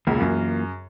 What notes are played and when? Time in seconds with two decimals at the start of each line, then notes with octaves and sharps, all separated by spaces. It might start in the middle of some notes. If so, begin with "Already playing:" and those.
0.07 E1 C#2 E3 A#3 F4
0.20 F#2